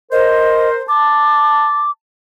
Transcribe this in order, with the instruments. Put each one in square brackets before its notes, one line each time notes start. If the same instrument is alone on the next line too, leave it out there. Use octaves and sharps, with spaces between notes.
[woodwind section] A#4 C5 [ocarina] D#5
[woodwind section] A5 [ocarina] D6